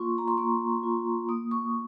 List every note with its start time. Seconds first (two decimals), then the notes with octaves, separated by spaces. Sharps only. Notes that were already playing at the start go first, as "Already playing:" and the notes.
Already playing: A#3 F4 C6 C#6
0.18 A#5
0.28 C6
0.38 A#3 C#6
0.83 F4
1.29 A#3 D#6
1.51 C#6